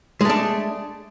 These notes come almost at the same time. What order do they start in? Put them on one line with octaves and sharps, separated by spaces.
G#3 A3 D4